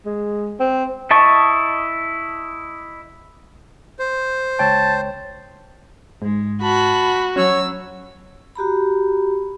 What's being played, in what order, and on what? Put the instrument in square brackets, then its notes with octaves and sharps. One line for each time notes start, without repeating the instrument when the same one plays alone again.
[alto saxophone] G#3
C4
[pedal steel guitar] E4 D#5 A5 C#6
[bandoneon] C5
[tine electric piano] C#2 C#5 G5 [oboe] A5
[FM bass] G#2 [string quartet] G#3
[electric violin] F#4 [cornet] A5 [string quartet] B5
[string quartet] F#3 E6 [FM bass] C#4 [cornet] C#5
[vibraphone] F#4 G4 A#5 B5